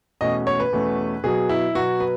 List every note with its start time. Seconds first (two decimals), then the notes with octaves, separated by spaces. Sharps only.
0.21 E2 B2 A3 C#4 D#5
0.47 C#5
0.60 B4
0.73 E2 B2 A3 C#4
1.24 B2 F#3 B3 G#4
1.49 E4
1.75 B2 F#3 B3 F#4
2.00 B4